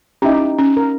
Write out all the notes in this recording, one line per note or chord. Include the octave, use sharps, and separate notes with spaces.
C#4 D#4 E4 G4
C#4
A#4